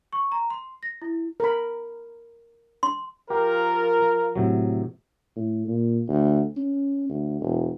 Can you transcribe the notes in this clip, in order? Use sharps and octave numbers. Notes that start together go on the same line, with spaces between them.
C#6
A#5
C6
A#6
E4
A#4 B5
C6
F3 F4 G4 A#4 F5 G5
A2 C3 F#3
A2
A#2
D2
C#4
D2
E1